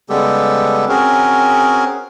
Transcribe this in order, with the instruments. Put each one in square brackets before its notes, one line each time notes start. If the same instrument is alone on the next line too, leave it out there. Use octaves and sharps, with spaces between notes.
[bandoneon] C#3 G3 G#3 B3 G4 A4
C4 C#4 F#4 G#4 A#4